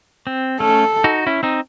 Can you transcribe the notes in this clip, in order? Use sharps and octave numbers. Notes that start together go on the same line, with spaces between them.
C4
A3 C#4 A4
D#4 F#4
C#4 E4
C4 D#4